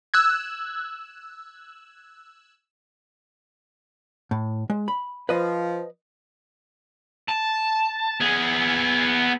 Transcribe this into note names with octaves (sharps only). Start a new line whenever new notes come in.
E6 F#6 G#6
A2
G#3
B5
F3 B4 D#5
A5
B3 G#4